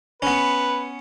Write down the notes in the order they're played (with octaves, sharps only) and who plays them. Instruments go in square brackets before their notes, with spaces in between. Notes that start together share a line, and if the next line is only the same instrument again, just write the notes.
[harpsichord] B3 C#4 [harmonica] B4